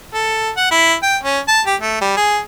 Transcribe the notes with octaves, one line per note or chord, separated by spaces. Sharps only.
A4
F#5
E4
G5
C#4
A5
G4
A3
G3
G#4